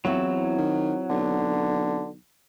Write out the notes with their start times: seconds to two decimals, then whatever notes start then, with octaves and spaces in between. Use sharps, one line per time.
0.05 E2 F#3 C4 E4 F4
0.58 D#3
1.10 B1 D3